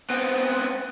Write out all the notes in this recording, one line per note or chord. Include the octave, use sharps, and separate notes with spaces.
B3 C4